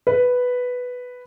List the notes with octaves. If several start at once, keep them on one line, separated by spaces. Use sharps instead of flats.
B4